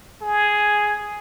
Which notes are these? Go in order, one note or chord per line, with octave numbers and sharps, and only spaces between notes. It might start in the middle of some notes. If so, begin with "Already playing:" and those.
G#4